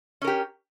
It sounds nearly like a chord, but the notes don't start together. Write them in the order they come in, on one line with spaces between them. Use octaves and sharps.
C#4 A#4 G4